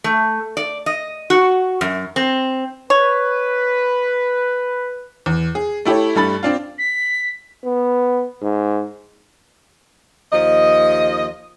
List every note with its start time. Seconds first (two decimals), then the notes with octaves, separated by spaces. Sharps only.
0.04 A3
0.57 D5
0.86 D#5
1.30 F#4
1.81 F#2
2.16 C4
2.90 B4 C#5
5.26 E2
5.55 G#4
5.85 A3 E4 G4 A4 C#5
6.15 G2 G3 A3 A4 B5 A6
6.43 C4 D4 F4
6.78 B6
7.64 B3
8.42 G#2
10.32 D#2 F3 D#5